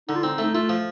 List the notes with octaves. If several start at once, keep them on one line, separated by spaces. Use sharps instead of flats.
D3 D#4
F4
C4 D#4
A3
D#4
A3 F4
F3